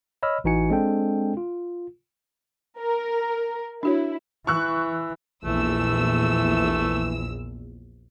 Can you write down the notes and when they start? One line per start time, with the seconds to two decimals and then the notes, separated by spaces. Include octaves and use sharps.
0.23 C#5 D#5 B5 E6 F6
0.44 A1 E3 D#4 F#4 G#5 C#7
0.70 G#3 C4 D4 A4 G5
1.37 F4
2.79 A#4
3.83 D4 E4 F#4 C#5
4.47 E3 C#6 E6 F#6
5.45 A#1 E2 E3 A3 E6